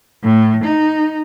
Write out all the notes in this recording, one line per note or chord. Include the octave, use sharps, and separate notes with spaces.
A2
D#4